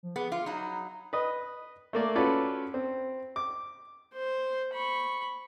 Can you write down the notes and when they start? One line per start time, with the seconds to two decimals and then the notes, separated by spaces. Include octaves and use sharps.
0.03 F3
0.16 B3 G#4
0.32 F4 D6
0.46 F#3 D#4 B5
1.13 B4 D#5
1.93 A3 A#3 D5
2.15 C#4 F4 F#4 A4 B4 D5
2.74 C4
3.36 D6
4.13 C5
4.73 B5 C#6